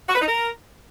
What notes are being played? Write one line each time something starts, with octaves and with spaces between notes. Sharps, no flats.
F#4
B4
D#4
A#4